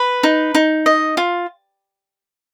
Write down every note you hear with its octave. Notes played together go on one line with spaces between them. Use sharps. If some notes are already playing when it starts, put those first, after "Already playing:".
Already playing: B4
D#4
D#4
D#5
F4